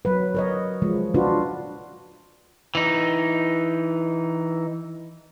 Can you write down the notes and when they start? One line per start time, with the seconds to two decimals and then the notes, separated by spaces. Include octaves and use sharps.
0.05 F#3 B4
0.34 A#4 C#5 D#5
0.82 F3 G#3
1.14 D4 F4 F#4 B4
2.75 E3 D#4